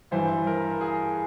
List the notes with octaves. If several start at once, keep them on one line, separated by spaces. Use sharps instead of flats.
G2 E3 C5
A#4
G#4